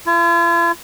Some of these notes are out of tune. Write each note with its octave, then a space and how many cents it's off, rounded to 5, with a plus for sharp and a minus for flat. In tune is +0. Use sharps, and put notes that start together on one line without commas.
F4 -45